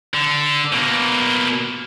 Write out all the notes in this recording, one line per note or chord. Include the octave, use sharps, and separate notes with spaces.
D3
B2 A#3